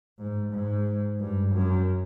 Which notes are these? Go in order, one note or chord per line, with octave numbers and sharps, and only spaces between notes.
G#2
G#2
G2
F#2